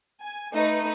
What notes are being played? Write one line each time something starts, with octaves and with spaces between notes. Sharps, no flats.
G#5
A3 D#4 B4